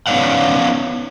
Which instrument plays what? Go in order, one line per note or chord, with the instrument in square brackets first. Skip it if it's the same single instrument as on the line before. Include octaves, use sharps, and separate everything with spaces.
[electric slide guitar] B3 C#4 D#4 D5 F5 F#5